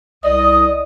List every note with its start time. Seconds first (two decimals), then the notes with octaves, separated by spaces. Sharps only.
0.24 C2 D5 D#5 D#6